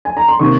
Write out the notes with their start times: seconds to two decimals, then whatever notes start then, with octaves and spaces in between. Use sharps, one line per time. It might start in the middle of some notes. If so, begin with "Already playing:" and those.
0.05 G#5
0.17 A#5
0.28 C6
0.39 C3 D#3 A#3 C#6